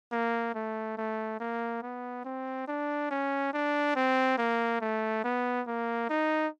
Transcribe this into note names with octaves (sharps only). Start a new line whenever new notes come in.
A#3
A3
A3
A#3
B3
C4
D4
C#4
D4
C4
A#3
A3
B3
A#3
D#4